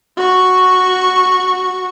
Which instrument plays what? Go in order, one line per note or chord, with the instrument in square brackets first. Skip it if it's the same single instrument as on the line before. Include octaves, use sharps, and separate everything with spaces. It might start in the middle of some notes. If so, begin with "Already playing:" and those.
[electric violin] F#4 C#6